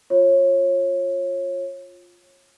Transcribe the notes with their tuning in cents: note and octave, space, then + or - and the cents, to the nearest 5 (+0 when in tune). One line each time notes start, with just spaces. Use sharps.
F4 +10 C#5 -30